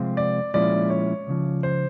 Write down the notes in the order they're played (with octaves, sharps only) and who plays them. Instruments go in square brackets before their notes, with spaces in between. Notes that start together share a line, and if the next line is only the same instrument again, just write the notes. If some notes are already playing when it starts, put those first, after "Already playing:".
Already playing: [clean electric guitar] C3 F3 G#3 C4 F4
[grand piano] D5
[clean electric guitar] A#2 F3 G#3 C#4 E4 [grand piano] D5
[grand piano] C#5
[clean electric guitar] C#2 C#3 F3
[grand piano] C5